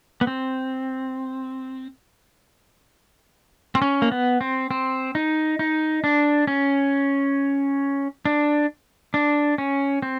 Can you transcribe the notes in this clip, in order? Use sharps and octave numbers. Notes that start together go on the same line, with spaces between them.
B3
C4
C4
C#4
A#3
B3
C4
C4
D#4
D#4
D4
C#4
D4
D4
C#4
C4